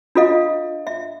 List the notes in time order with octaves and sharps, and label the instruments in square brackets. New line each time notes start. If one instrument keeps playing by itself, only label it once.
[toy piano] D4 F4 A4 D#5 F5
E5